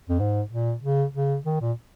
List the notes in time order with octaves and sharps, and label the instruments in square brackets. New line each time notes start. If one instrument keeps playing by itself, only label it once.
[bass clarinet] F2
G#2
A#2
C#3
C#3
D#3
A#2